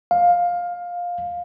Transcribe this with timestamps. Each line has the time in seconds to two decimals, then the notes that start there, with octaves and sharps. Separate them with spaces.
0.11 F5